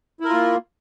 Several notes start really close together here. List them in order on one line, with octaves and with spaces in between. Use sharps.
E4 A#4 F4 A#3